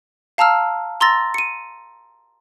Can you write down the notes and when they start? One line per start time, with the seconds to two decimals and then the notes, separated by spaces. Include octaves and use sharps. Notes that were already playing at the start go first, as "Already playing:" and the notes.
0.38 F5 A5 A#5 E6 F6
1.01 A#5 C6 E6 A6 A#6
1.34 C#7 D#7